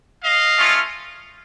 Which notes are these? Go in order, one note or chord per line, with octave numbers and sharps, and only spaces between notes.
D#5 F5
A3 C#4 F4